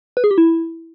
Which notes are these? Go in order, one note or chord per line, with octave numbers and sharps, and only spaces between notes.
B4
G#4
G4
E4